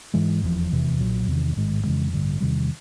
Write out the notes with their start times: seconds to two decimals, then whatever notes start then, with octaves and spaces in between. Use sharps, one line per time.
0.14 G#2 E3 G#3
0.43 F1 E2 C3 F3
0.71 F1 E2 C3 E3
0.99 B1 A#2 F#3
1.27 E2 C3 D#3
1.56 A1 G#2 D#3 G#3
1.84 F2 C#3 E3 G#3
2.12 A1 G2 D3
2.40 E2 C3 D#3 G3